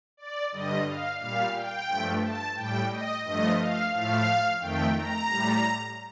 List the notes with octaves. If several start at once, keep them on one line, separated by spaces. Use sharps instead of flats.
D5
G2 D3 G3 D#5
F5
A#2 G3 F5
G5
G2 F3 A3
A5
A2 G3 G5
D#5
G2 F3 A3 D#5
F5
A2 F3 A3 F5
F2 D#3 A3 G5
A#5
A2 G3